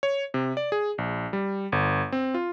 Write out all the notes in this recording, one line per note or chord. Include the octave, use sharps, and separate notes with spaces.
C#5
C3
D5
G#4
A#1
G3
G1
C4
F4